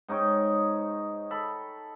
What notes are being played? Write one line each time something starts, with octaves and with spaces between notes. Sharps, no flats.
G#2 D#4 C#5 G5
A4 B5